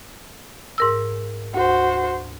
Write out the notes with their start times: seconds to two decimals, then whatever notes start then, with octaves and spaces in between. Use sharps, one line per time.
0.78 G#2 A#4 E6
1.54 D2 F#4 C5